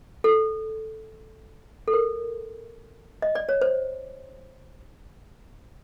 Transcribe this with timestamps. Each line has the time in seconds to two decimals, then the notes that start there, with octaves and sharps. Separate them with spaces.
0.24 A4
1.88 A4
1.93 A#4
3.22 D#5
3.35 D5
3.49 C#5
3.61 C5